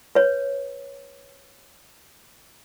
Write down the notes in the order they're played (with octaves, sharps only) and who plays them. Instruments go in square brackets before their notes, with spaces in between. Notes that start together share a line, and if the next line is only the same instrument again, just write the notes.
[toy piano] B4 C#5